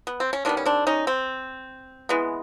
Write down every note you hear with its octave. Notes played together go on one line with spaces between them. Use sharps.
B3
C4
C#4
D#3 G3 B3 C4 D4
C#4
C4 D4
C#4 D#4
C4
E3 G#3 B3